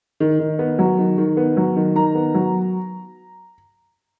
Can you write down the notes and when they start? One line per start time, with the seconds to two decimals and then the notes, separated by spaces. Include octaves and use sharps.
0.20 D#3
0.39 D#3
0.59 B3
0.79 F#3
0.99 D#3
1.18 D#3
1.37 B3
1.57 F#3
1.76 D#3
1.95 D#3 A#5
2.15 B3
2.34 F#3